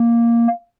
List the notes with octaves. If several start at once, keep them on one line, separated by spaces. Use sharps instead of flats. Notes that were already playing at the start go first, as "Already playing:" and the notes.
Already playing: A#3